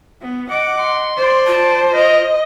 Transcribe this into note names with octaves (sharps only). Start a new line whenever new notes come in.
B3
D#5 F#5 D6
C6
C5 D5
F4 A5
A#4 D#5